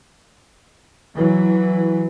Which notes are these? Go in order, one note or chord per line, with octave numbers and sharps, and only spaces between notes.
E3 F#3